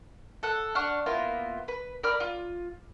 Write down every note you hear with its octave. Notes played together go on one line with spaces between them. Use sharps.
A4 F#5
D4 F#5 C#6 F6
A#3 B3 E4 F4
B4
A#4 D5 B5 F6
F4